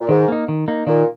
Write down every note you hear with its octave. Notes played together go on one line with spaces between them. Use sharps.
A#2
G#2 D#3
A#3 D#4
D#3
A#3 D#4
A#2 D#3